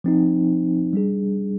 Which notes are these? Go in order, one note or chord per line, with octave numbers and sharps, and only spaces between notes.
F3 C4 D#4
G3 D4 G#4